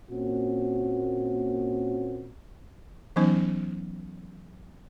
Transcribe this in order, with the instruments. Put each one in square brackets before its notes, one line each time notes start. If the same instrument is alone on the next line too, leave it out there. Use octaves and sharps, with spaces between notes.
[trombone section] A#2 A#3 C4 C#4 F#4
[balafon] E3 F#3 B3 C#4 D#4 C5